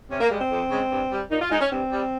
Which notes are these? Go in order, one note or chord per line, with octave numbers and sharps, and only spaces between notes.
C3 C#4
A#3
G3 G#3
C4
F2
C#3 G#3
G2
G3
A#2 D#4
F4
G#3 D#4
C#4
G2 C4
G3